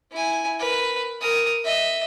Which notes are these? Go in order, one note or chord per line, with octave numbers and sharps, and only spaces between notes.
E4 G#5
A#4 B4
A#4 D#6
D#5 E5